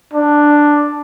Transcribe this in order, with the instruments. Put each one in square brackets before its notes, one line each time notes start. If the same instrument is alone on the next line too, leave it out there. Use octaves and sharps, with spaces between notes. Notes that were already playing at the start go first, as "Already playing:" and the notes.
[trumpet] D4